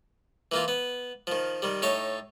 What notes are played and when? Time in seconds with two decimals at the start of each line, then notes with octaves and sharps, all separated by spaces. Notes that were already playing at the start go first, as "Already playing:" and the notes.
0.52 E3 A#3 F4
0.68 B3
1.27 D#3 F3
1.62 D#3 G3
1.82 A2 D#4 C#5 A5